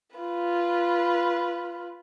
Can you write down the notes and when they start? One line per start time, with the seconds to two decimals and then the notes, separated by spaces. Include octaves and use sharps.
0.16 F4 B4